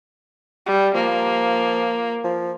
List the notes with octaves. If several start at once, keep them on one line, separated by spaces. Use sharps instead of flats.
G3
F3 A#3
F3